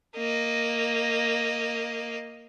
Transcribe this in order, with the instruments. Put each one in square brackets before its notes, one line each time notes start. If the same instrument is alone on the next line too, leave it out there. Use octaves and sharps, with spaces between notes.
[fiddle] A#3 D#5